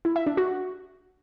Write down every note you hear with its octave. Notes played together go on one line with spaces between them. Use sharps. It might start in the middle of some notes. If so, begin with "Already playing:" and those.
E4
E5
D4
F#4